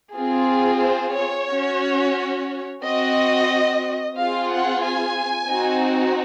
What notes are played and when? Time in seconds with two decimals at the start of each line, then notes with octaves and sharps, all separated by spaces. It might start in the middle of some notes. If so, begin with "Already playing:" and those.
0.15 C4 F4 G#4
0.82 C5
1.16 C#5
1.49 C#4 F#4
2.83 C4 F#4 D#5
4.17 C4 F4 G#4 F5
4.50 F#5
4.84 G#5
5.51 C4 D#4 F#4